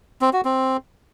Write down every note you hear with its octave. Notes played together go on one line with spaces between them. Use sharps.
C4
F#4
C4